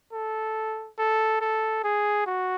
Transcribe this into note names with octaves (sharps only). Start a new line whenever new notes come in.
A4
A4
A4
G#4
F#4